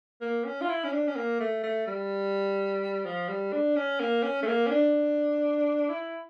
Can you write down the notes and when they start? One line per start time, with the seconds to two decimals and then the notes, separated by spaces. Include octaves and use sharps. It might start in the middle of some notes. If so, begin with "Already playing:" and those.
0.21 A#3
0.45 C#4
0.61 F4
0.69 E4
0.84 C#4
0.92 D4
1.07 C#4
1.16 A#3
1.40 A3
1.63 A3
1.87 G3
3.05 F3
3.29 G3
3.52 D4
3.76 C#4
4.00 A#3
4.23 C#4
4.43 A3
4.47 A#3
4.67 C#4
4.71 D4
5.89 E4